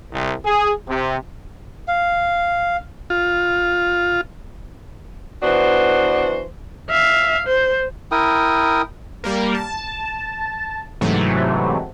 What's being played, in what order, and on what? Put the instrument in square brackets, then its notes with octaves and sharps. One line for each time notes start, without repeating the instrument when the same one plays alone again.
[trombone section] C2
G#4
C3
[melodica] F5
[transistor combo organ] F4
[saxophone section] E3 B3 D4 F#4 C5
[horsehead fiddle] E5 F5
C5
[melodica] E4 A#4 G5 D#6
[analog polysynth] G3 A#3 A#4
A5
G#2 C3 E3 F#3 A3